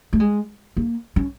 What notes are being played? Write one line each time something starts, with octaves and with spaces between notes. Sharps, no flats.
A3
G#3
A#3
C#4